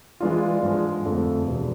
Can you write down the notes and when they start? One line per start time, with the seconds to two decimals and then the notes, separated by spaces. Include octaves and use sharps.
0.20 E3 G#3 D4 F4
0.62 G#2 F3 G#3
1.05 F2 D3 A3
1.47 E2 B2 G#3